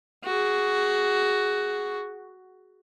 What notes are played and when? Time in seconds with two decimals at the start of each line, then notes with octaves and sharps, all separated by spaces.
0.24 F#4 G#4